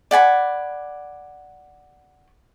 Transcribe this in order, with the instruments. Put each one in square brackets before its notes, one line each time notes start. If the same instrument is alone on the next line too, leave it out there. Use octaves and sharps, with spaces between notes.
[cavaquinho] D5 F#5 G#5 B5